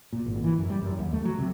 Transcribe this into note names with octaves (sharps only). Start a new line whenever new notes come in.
A#2
G#1
E3
F#2
G3
F#2
D#2
A3
F#3
C3